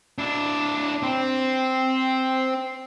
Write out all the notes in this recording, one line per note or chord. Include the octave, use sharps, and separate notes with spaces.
D4 E4
C4